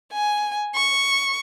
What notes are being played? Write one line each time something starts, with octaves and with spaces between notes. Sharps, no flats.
G#5
C#6